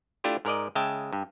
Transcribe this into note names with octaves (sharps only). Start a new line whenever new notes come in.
A3 D4 E4 F4 G4
G#2 A#4 D5 D#5
C#3 G#3 E5 G5 A5
G2